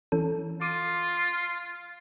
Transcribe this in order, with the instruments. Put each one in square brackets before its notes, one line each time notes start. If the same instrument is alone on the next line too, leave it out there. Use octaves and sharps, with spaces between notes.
[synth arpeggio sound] E3 C#4 A4
[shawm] F4 [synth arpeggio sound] D6 D#7